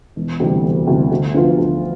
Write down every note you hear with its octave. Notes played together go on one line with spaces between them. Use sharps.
E1
D2 C3 E3 G3
E1
D2 C3 E3 G3
D2
D3 F3 B3 F4
D2